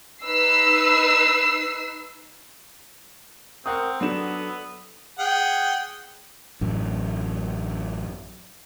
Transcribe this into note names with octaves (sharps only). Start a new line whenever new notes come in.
D#4 B4 E6 C7
C4 A#4 F#5 A#5 D#6
F#3 B3 D4 A4 E7
G#4 F#5 G5
A1 F#2